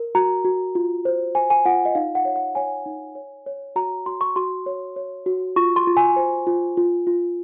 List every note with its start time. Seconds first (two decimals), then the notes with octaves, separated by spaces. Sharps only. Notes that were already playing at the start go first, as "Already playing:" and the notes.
Already playing: A#4
0.15 F#4 A#5
0.45 F#4
0.75 F4
1.05 C5
1.35 C5 G#5
1.50 G#5
1.66 F4 F#5
1.85 D#5
1.95 D#4 F5
2.15 F#5
2.25 C#5
2.36 F#5
2.55 C#5 G#5
2.86 D#4
3.15 C#5
3.46 C#5
3.76 F#4 A#5
4.06 F#4 C6
4.21 C#6
4.36 F#4 C6
4.66 C#5
4.96 C#5
5.26 F#4
5.56 F4 C#6
5.76 C6
5.87 F4
5.97 G#5
6.16 C5
6.47 F4
6.77 F4
7.07 F4